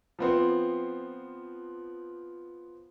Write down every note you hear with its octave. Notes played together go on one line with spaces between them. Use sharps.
F3 B3 C4